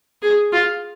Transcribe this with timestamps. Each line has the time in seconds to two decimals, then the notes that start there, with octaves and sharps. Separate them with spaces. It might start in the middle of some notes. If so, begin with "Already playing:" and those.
0.22 G#4
0.53 F4